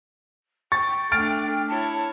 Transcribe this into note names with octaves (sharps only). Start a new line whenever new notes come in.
G5 C#6 A6
A3 D4 F6 A6 D7
E4 C#5 A5